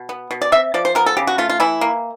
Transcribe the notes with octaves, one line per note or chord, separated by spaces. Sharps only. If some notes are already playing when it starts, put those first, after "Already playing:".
Already playing: B2
B3
B2
D5
C4 E5
F3 D5
C5
B3 A#4
A4
C#3 G4
F#4
A3 F4
F4
E3 E4
A#3